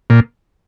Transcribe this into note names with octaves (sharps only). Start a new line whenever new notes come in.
A#2